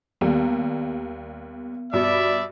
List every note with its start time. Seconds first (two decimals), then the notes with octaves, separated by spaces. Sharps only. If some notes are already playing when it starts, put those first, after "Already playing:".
0.21 D#2 G3 B3
1.93 G2 B2 D5 E5 B5